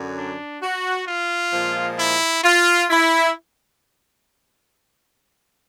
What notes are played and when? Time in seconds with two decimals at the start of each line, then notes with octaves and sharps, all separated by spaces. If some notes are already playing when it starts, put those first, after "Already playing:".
Already playing: F#2 D3 F#3
0.17 D4
0.63 F#4
1.07 F4
1.53 A#2 F3 G#3
1.99 E4
2.44 F4
2.90 E4